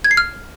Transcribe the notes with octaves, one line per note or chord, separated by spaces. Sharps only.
G#6
C7
F6